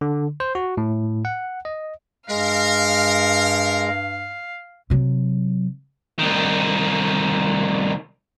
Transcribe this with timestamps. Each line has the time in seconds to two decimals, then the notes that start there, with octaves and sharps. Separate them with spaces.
0.01 D3
0.40 C5
0.55 F#4
0.77 A2
1.25 F#5
1.65 D#5
2.29 G2 G#3 A#4 F5
4.90 C3 F#3
6.19 C2 D#3